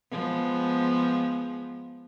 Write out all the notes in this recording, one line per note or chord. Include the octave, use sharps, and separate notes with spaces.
F3 G#3 B3